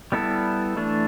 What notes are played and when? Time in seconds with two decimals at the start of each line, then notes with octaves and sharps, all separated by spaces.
0.12 G3 B3 E4 A4
0.77 E3 A3 D4